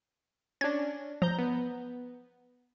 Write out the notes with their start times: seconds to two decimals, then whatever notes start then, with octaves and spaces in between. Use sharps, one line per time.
0.61 C#4 D4 G#6
1.22 F3 A#5 G6
1.38 B3